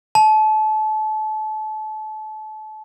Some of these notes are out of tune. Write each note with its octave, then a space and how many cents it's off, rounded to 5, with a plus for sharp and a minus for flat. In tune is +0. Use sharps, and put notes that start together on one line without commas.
A5 -30